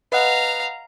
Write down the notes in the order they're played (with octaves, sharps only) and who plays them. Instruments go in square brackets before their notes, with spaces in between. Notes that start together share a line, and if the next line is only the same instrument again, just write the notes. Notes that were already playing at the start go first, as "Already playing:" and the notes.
[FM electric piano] B4 D#5 F#5 [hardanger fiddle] F5 A#5